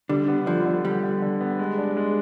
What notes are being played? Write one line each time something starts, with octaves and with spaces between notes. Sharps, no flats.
D3 G3
B3
D3 F3
D3
D3 G3
D3
D3
B3
G#3
D4
G#3